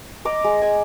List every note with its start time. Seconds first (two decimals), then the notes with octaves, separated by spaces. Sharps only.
0.25 D#5 A#5 D6
0.44 G#3
0.62 G#5